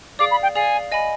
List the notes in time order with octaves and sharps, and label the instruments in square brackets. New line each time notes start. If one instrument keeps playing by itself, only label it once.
[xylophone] G#4 D5 F5 [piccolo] D6
[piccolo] B5
G5
[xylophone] G#4 D5 F5 [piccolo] G#5
[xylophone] D#5 G#5 B5